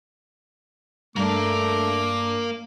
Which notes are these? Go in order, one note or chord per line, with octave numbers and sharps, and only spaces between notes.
G2 A3 A#3 D4 A#4 D6